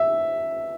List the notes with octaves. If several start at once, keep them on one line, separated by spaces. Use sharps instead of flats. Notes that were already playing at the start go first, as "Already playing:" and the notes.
Already playing: E5